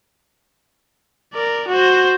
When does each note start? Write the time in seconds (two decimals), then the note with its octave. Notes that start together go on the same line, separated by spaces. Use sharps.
1.33 A#4 D5
1.68 F#4 C5